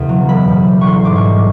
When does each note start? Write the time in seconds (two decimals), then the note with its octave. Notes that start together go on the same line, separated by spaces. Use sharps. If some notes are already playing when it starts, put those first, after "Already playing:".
Already playing: E1 E2 C#3
0.09 F#3
0.29 E1 B5
0.48 E2
0.68 G3
0.81 C#6
0.86 A1 C6
1.05 G#2 D6
1.16 C#6
1.25 G3